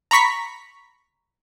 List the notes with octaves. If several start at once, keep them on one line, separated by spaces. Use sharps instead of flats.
A#5 B5 C#6 B6